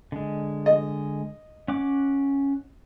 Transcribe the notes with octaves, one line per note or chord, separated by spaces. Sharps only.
D3 G#3
D#5
C#4 F#5 D6